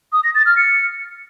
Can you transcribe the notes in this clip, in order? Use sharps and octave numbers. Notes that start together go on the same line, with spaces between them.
D#6
A#6
A6
F6
C#7